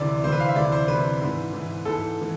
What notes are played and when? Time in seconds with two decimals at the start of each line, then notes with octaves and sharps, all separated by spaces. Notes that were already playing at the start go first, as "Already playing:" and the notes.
Already playing: D2 C3 E3 D5
0.24 D2 C3 E3 C5
0.32 B4
0.40 F5
0.48 E5
0.56 D2 C3 E3 D5
0.72 C5
0.88 D2 C3 E3 B4
1.21 G#2 E3
1.53 G#2 E3
1.85 G#2 E3 A4
2.22 E3